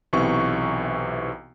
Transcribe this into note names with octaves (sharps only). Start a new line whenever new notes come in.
B1 C3 E3 C#6